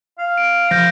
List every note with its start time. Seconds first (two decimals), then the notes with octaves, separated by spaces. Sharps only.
0.19 F5
0.38 D7
0.71 F3 G6 A#6